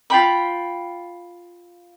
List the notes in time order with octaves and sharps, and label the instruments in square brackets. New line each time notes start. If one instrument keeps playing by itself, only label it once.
[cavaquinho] F4 G5 B5